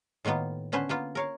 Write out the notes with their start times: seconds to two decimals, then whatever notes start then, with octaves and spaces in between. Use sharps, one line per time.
0.25 A2 D#3 A#3 B3 F4
0.72 D3 B3 C#4 B4 C5
0.89 A#3 B3 F4
1.15 A#4 C#5 F5